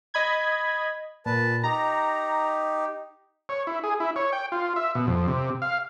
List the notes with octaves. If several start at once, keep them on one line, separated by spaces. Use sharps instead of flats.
D#5 B5 G#6
A#2 B4 A5
D#4 G4 A#5
C#5
E4
G#4
E4
C#5
G5
F4
E5
B2
F2
C3
F5